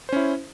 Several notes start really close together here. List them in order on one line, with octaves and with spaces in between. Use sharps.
C5 C#4 E4